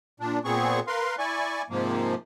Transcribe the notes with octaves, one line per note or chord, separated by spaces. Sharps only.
A#2 D4
A#2 B3 C4 G#4 C#6
A#4 B4 F5 C6
E4 D5 G#5 C#6
G#2 C3 F3 A#3